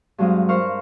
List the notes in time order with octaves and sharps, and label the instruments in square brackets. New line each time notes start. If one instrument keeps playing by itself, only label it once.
[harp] G2 F#3 G#3 C4 F5 D#6
A#4 C5 F5 C#6 F6